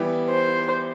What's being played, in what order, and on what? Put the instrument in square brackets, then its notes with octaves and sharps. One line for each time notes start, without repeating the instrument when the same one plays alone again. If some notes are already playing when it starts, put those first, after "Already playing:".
Already playing: [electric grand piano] E3 G3 B3 E4 G4
[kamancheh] C5